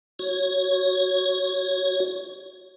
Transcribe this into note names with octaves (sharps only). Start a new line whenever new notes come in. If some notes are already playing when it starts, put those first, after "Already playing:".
F#4 C#5